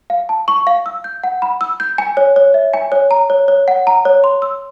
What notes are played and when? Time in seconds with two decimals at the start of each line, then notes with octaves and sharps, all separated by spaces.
0.10 F5
0.29 A5
0.48 C#6
0.67 F5
0.86 E6
1.04 G6
1.24 F#5
1.42 B5
1.61 E6
1.80 G6
1.98 G#5
2.17 C#5
2.36 C#5
2.54 E5
2.74 G#5
2.92 C#5
3.11 A#5
3.30 C#5
3.48 C#5
3.68 F#5
3.87 A#5
4.05 C#5
4.24 C6
4.42 E6